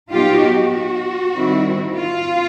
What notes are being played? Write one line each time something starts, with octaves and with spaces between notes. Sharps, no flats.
A#2 F#3 B3 D#4 F4 G4
F#4
D#3 G3 C4 E4
F4